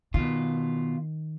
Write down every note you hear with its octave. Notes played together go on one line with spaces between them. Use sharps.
B2 D#3 F4